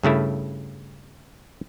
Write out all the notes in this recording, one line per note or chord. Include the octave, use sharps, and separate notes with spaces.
G2 C#3 A3 E4